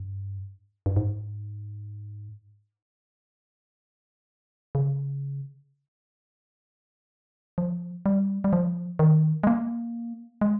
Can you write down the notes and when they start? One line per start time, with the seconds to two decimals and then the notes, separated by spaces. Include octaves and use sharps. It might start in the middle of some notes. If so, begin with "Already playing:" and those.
Already playing: G2
0.86 G2
0.96 G#2
4.75 C#3
7.58 F3
8.06 G3
8.44 G3
8.53 F3
8.99 D#3
9.43 G#3
9.47 A#3
10.41 G#3